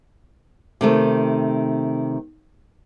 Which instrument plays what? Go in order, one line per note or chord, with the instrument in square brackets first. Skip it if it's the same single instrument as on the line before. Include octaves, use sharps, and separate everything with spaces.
[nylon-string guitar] C3 D#3 A3